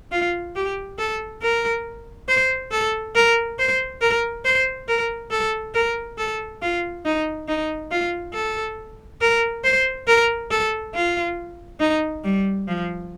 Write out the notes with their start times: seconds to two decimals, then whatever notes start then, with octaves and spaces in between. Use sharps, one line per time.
0.12 F4
0.55 G4
0.99 A4
1.42 A#4
2.29 C5
2.71 A4
3.15 A#4
3.59 C5
4.01 A#4
4.45 C5
4.88 A#4
5.31 A4
5.74 A#4
6.18 A4
6.62 F4
7.05 D#4
7.48 D#4
7.91 F4
8.34 A4
9.21 A#4
9.64 C5
10.07 A#4
10.51 A4
10.94 F4
11.80 D#4
12.24 G3
12.68 F3